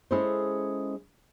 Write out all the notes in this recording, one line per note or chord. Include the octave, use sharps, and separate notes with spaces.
G#3 C#4 E4 G#4 A4 C5